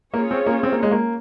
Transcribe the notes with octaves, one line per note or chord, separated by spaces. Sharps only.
A#3 C#4 F4 G#4 C#5
C4
A#3
C4
A#3
G#3
A#3